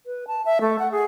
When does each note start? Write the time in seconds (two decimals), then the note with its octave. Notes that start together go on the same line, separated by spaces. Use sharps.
0.06 B4
0.27 A5
0.45 E5
0.61 A3
0.79 F#5
0.92 G#4